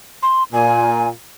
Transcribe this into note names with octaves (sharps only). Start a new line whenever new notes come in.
C6
A#2 G#5